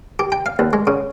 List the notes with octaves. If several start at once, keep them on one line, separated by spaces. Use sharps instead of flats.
G4
G5
F5
D#2
G#3
C#3